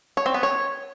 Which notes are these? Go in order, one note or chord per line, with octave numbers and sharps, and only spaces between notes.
C#5
C4
B3
C#5